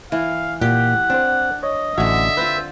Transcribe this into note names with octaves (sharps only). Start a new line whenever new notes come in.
E3 F5
A#2 G4 F#5
C4 D4 C5
C#5 D#5
A1 D3 F#4 C#5 E5
C4 F4 B4 C5